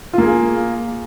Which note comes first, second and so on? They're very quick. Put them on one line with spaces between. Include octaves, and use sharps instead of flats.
F4 A#3 G#4